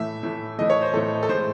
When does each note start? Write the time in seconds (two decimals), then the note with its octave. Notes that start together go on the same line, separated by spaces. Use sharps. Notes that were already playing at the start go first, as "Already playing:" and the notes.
Already playing: A2 E3 A3 E5
0.23 A2 E3 A3
0.59 A2 E3 A3 D#5
0.70 C#5
0.82 C5
0.93 A2 E3 A3 A4
1.23 A4
1.29 A2 G#3 C5